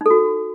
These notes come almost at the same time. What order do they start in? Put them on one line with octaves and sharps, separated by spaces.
D#4 A4 F#4